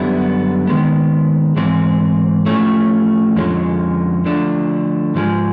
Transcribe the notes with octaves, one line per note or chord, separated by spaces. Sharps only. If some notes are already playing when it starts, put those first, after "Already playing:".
Already playing: F#2 D3 G3 B3 E4
D#3 G#3 B3
G#2 E3 G#3 C4
A2 F3 A3 C#4
F2 D3 F3 G#3 C#4
D3 F3 A3 D4
G#2 F3 G#3